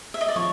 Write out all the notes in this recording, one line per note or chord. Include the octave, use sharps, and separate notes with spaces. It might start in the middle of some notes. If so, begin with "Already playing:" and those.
E5
D#5
D5
F3 C#5